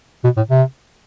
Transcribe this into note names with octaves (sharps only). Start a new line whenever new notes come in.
B2
A2
C3